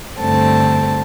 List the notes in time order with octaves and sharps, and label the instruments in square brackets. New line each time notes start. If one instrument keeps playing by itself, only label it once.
[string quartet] G2 D3 A3 C4 A5